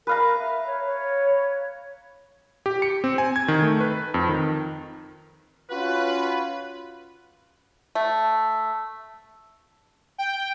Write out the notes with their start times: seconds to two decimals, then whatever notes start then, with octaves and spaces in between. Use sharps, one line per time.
0.07 A#4 B4 F5 A#5
0.39 E5
0.67 C#5
0.86 C#5
2.66 G4
2.82 C#7
3.04 C4
3.18 G#5
3.36 G#6
3.48 D#3
3.62 A3
3.81 B4
4.14 F2
4.29 D#3
5.70 C#4 F4 F#4 B4
7.95 A3
10.18 G5